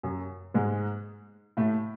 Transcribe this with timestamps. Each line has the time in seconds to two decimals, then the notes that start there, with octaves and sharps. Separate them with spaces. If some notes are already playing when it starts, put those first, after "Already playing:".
0.03 F#2 F#3
0.54 G#2 G#3
1.57 A2 A3